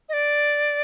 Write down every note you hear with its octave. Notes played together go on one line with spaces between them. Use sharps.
D#5
D5